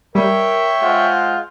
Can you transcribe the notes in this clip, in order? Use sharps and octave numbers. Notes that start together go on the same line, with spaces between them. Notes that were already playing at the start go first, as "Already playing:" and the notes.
G3 A#4 C#5 E5 G5
G#3 F4 C5 F#5